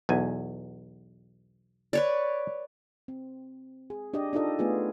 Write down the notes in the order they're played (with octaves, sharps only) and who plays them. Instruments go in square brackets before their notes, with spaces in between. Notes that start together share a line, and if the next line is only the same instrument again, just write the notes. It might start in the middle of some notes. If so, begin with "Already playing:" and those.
[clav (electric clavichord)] B1 E2 G#5
[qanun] B4 C#5 D5
[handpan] C4
G#4
D4 G4 D5 D#5
D4 D#4 F4 A4 D#5
A3 B3 F4 G#4